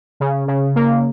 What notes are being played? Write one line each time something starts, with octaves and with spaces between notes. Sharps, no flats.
C#3
C#3
A#3